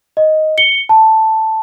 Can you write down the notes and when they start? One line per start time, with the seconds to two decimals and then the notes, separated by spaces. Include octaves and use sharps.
0.17 D#5
0.58 C#7 G7
0.89 A5